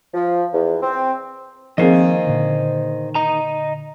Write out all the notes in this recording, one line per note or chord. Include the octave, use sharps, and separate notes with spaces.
F3
E2
C4
D#3 F3 A#3 C4 G#4 C5 D#5
A#2 D3
D#5 A#5